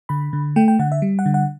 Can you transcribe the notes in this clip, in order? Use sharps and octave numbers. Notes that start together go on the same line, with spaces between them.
D3 B5
D3
A3 G5
G5
D3 F#5
E5
G3
F#5
D3
F#5